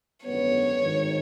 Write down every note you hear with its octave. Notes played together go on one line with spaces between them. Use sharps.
G#1 F#2 D3 G3 B3 C#5
G#1 G2 D#3